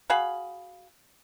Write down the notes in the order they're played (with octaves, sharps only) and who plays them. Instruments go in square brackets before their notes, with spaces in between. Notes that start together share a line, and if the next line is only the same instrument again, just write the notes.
[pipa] F#4 G#4 F5 B5